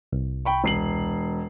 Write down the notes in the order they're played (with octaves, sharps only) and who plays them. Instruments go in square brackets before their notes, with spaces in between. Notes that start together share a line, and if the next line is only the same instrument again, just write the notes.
[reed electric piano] C2
[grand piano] G5 B5 C#6
E1 C7 F#7